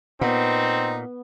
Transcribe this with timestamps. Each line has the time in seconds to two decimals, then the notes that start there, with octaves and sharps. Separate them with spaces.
0.21 A#2 B3 C4 D#4